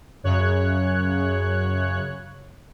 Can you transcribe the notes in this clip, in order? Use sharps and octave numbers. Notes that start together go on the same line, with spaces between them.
F#2 C#3 C#5 F#6